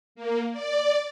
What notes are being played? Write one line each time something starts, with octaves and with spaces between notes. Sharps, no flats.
A#3
D5